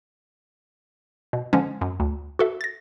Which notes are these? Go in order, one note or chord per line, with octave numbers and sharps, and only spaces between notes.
B2
D3 F3 G#3 C#4
F#2
D2
F#4 A4 E5
A6 A#6